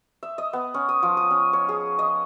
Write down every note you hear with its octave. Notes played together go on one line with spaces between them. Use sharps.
E5
D#5
B3
C#4
D#6
F3
D#6
C#4
C#5
G#4
D#5